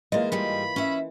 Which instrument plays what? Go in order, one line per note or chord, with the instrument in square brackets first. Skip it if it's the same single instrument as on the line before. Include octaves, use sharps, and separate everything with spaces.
[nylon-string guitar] E3 A#3 F4 [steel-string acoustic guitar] G#3 C5 [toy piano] D#5
[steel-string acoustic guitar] G#2 G3 G#3 [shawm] B5
[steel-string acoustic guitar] C#4 E5